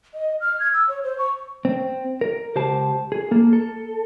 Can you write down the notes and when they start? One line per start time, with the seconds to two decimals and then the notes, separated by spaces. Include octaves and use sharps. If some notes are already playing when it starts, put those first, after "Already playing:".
0.14 D#5
0.41 F6
0.60 G#6
0.74 E6
0.89 C#5
1.04 C5
1.19 C#6
1.65 C4
2.21 A#4
2.56 C#2 G4 C5 A5
3.12 G#4
3.31 A#3 A4
3.53 A4